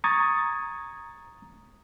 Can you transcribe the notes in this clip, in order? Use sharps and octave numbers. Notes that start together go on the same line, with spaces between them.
A#5 C#6 D#6 G#6 A6